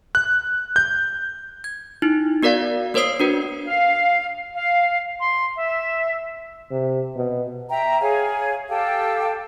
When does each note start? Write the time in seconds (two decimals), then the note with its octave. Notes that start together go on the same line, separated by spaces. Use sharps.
0.15 F#6
0.76 G6
1.64 G#6
2.02 D#4 E4
2.43 B3 F#4 A#4 D5 F5
2.94 A#3 A#4 C5 C#5 D#6 C7
3.20 D4 F#4 B4
3.67 F5
4.55 F5
5.20 C6
5.57 E5
6.71 C3
7.16 B2
7.70 E5 G5 A#5
8.01 G#4 C#5 F5 G#5
8.69 G4 A4 F5 G5